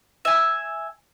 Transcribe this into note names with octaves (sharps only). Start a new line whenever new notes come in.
E5 G#5